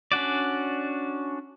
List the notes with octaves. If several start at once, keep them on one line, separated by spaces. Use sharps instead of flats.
C#4 D4 F#4 D5